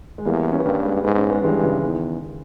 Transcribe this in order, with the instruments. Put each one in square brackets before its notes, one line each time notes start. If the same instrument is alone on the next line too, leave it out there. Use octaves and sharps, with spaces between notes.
[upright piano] G#3
[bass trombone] E2 [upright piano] G3 A#3
[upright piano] C#4
B3
[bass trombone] G2 [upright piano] G3 A#3
[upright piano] A#3
G#3 B3
[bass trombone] G#2 [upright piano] B3
[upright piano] C#4
G#3 B3
[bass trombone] G2 [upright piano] E3 G#3
[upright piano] C#3 E3
[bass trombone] E2 [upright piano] D#3